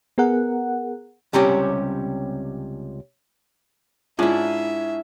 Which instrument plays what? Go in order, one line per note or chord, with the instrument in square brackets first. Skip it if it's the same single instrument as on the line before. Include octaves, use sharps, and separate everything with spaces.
[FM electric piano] B3 G#4 A#4 F#5
[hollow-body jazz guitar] C#2 C3 G3 C4 C#4 G4
[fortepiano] G#2 C#4 G#4 [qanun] D4 E4 [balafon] F4 [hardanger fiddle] E5